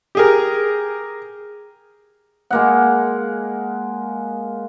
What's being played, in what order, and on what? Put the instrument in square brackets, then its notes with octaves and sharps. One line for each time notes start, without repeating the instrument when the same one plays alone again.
[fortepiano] G4 G#4 A#4
[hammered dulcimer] G#3 A#3 F#5